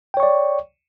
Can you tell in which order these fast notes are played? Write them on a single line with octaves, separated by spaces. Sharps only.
G5 C#5 C#6 D5